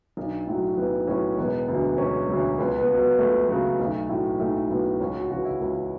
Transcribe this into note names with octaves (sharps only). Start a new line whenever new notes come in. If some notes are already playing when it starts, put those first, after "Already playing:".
B1 D4
A2 F#3
B1 B3
A2 F#3 C#4
E1 B3
D2 D3 F#3
E1 C#4
D2 D3 F#3
C#2 B3
B3
C#3 F#3
B3
C#2 A3
C#3 F#3 B3
B1 A3
A2 F#3
B1 A3
A2 F#3 B3
C#2 C#4
F#4
C#3 E3 F#4
E4
C#2 F#4